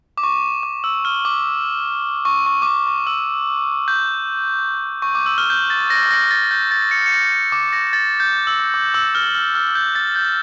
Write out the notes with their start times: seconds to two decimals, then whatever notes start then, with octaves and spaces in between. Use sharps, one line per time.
0.18 D6
0.23 C#6
0.63 D6
0.84 E6
1.05 F6
1.25 D6
2.25 C#6
2.46 C#6
2.62 D6
2.66 C#6
2.87 C#6
3.07 E6
3.88 G6
5.02 C#6
5.15 D6
5.26 E6
5.38 F6
5.50 G6
5.70 A6
5.90 A#6
6.11 A#6
6.31 A6
6.51 G6
6.71 A6
6.91 C#7
7.06 C#7
7.12 A#6
7.32 C#7
7.52 D6
7.73 A#6
7.93 A6
8.20 G6
8.47 E6
8.74 D6
8.94 E6
9.15 F6
9.35 F6
9.55 F6
9.75 G6
9.95 A6
10.16 G6